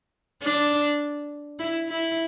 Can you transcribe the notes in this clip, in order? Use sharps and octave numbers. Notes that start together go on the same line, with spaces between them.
D4
E4
E4